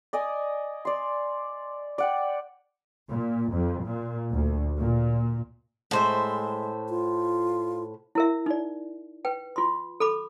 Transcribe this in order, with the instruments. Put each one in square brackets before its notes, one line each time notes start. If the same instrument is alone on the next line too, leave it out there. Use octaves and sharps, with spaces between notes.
[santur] D5 D#5 G#5 D#6
D5 C6
D5 F#5 G5
[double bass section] A#2
F2
A#2
D2
A#2
[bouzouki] A2 C5 E5 [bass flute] G#3
[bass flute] F4
[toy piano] E4 A#4 E5
D#4 D5
B4 G5
F4 C6
A4 B5 D6